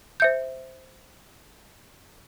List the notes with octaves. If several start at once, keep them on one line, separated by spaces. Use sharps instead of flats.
C5 E5 G6